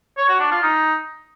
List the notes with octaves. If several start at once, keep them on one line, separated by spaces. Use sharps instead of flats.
C#5
F#4
D4
F4
D#4